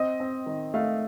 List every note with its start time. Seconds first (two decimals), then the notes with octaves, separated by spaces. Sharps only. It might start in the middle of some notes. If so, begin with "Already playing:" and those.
Already playing: C4 D#5
0.20 C4
0.46 D#3
0.74 A3 F5